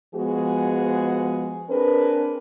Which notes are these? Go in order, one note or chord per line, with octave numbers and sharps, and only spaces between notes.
F3 G#3 B3 F#4 G#4
C4 D4 G#4 A#4 B4